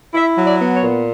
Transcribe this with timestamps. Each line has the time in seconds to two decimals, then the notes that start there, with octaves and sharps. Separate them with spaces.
0.14 E4 E5
0.38 F#3
0.45 D5
0.60 B3
0.75 C#5
0.83 A#2